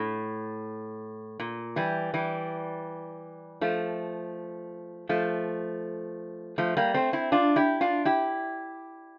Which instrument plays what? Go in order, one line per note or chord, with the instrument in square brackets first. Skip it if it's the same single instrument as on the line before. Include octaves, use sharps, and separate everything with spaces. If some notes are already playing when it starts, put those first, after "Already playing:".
Already playing: [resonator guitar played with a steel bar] A2
A#2
E3 G3
E3 G3
F3 A3
F3 A3
F3 A3
G3 A#3
A3 C4
C4 E4
D4 F4
E4 G4
D4 F4
E4 G4